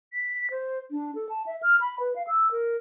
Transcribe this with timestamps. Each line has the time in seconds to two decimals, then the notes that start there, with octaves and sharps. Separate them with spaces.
0.13 B6
0.51 C5
0.91 D4
1.15 A4
1.29 A5
1.46 E5
1.63 F6
1.81 B5
2.00 B4
2.16 F5
2.28 E6
2.51 A#4